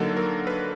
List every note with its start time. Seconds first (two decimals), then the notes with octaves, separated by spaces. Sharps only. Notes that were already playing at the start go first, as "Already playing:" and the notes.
Already playing: D3 F#3 A#3 D#4 A4
0.16 A#4
0.47 B4